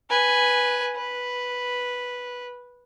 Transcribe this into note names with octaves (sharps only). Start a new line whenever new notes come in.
B4 G#5
B4